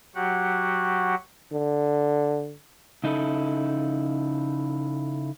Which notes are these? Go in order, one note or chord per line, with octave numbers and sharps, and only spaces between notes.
F#3 F#4 G4 F#5
D3
C#3 D#4 E4 A4